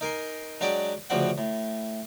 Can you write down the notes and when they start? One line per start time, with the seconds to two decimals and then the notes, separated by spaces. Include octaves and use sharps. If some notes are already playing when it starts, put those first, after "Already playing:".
0.01 D#4 A#4 G#5 C6
0.61 F#3 G#3 D4 F#4 G4 D5
1.10 D2 C#3 F3 G3 F#4 F#5
1.38 A2